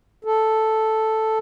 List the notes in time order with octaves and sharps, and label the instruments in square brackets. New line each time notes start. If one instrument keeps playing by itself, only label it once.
[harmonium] A4